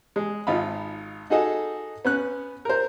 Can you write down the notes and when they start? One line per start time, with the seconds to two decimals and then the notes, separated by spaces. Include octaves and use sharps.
0.16 G#3
0.47 G#1 D#4 F4 B5
1.30 D#4 F#4 G#4 A4 D#5
2.05 B3 C#4 F#6
2.65 A#4 C5